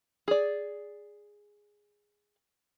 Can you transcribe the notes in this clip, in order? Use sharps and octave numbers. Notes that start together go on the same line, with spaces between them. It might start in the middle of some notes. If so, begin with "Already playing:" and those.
G#4 D5